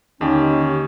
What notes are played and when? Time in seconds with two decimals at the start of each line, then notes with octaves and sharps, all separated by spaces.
0.21 D#2 D3 D#3 C#4 G4 D#5